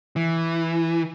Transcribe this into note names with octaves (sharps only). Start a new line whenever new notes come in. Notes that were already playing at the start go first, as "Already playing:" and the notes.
E3